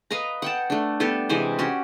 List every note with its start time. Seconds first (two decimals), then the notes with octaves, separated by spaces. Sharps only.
0.11 B4 D#5 F5 A#5
0.42 F#5 G5 A5
0.70 A3 D4
1.00 G3 B3 G4 A4
1.29 C3 E3 G#3 C5
1.59 C#4 F#4 G4